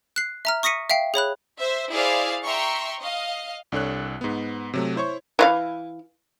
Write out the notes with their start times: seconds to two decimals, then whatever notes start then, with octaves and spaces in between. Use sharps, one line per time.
0.16 F#6 C7
0.45 E5 A#5 F6
0.63 C#6 D#6 A#6 B6 C#7 D#7
0.90 E5 F5 G5 C7
1.14 G#4 C#5 B5 F#6
1.59 C5 E5
1.91 E4 G#4 C5 D5 F5
2.43 E5 G5 A#5 C6 C#6
3.00 D#5 F5
3.72 C2 D4 A4 C#5 F#6
4.21 G#2 B3
4.74 C3 F#3 A3
4.96 E4 C5 C#5 C#6
5.39 E3 F4 F5